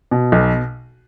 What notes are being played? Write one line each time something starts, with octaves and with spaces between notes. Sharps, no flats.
B2
B1